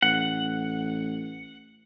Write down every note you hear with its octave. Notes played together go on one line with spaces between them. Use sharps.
A1 F#5